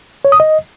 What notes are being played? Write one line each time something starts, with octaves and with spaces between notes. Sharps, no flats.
C#5
D#6
D#5